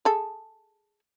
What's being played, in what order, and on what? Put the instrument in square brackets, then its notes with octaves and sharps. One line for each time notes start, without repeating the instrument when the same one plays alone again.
[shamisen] G#4 A4